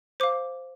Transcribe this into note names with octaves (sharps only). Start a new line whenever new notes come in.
C5 F5 D6